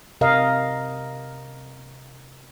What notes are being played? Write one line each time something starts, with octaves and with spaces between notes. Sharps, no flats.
C3 A#4 D#5 F5